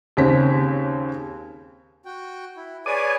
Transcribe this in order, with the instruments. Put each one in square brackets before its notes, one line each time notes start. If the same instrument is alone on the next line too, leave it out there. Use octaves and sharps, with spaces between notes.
[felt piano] D#2 C#3 C4 B6
[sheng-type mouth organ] F#4 G5
E4
[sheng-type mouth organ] G#4 B4 C#5 [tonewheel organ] D5 G#5